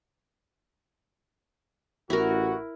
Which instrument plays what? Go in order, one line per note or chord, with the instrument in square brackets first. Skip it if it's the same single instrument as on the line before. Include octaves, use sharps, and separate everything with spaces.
[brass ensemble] A1 F#4 [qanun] E4 A#4